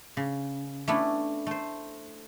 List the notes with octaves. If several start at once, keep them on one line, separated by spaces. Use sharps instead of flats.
C#3
A3 B3 C#4 D4 E4
A3 C5